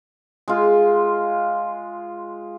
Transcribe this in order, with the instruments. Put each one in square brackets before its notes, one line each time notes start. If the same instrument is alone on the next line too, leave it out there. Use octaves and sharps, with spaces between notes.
[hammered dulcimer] G#3 F4